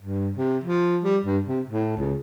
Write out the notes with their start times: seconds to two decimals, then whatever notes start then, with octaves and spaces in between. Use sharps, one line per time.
0.01 G2
0.37 C3
0.64 F3
1.04 G3
1.25 G2
1.47 C3
1.69 A2
1.97 C#2